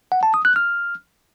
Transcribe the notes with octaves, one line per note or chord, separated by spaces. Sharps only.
F#5
A5
D#6
F#6
F6